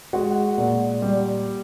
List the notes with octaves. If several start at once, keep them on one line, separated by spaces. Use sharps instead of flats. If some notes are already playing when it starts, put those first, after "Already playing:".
G#3 F#4 F#5
A#2
G3